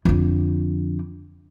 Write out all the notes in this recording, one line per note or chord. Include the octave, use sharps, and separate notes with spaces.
F2 D3